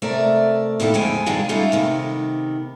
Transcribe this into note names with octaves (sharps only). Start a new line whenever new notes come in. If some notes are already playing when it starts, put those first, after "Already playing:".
C3 A3 A#4 D5
D#2 A#2 E4 G4 A4
F2 D3 G#3 B3 G5 G#5
G2 C3 D#3 G#3 D4 F4
G3 A3 C#4 D#4 F4
C3 D#3 B3